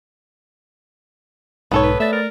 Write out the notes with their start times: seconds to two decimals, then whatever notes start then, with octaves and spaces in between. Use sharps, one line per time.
1.72 B1 G#2 B3 D#4 A4 C#5
1.83 B4
2.00 A3 D5 E5 A6
2.13 A#4